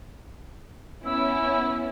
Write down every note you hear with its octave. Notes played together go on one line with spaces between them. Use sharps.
B3 C#4 E4 E6